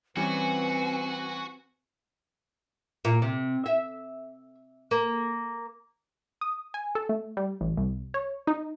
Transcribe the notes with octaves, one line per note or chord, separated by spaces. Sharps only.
E3 G3 C4 C#4 F#4 B4 G#5
A#2
C3
E5
A#3
D#6
G#5
A4
A3
G3
A1
C2
C#5
D#4